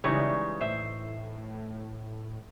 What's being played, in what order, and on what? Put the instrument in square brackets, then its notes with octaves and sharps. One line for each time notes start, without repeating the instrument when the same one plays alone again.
[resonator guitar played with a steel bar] C#3 G3 G#3 [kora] E3 D#4 E4 [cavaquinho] C#5 C#6
[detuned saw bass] A2 [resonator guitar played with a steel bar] C5 E5